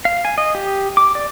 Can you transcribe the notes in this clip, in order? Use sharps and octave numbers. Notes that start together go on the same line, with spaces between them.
F5
G#5
D#5
G4
D6
D5